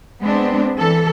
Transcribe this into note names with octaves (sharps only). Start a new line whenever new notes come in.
G#3 B3 C4 D4
E3 A4